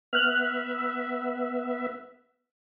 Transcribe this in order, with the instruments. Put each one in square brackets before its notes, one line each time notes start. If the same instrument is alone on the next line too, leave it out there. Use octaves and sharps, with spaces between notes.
[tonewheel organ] B3 E5 [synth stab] F6 F#6